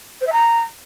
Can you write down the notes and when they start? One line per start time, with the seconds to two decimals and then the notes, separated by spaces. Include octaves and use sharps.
0.20 C5
0.26 E5
0.32 A#5